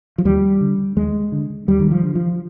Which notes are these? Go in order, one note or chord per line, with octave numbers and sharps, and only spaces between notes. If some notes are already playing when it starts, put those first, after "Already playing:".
F3
D#2 G3
D3
D#2 G#3
D3
D#2 G3
D#3
F3
D3
F3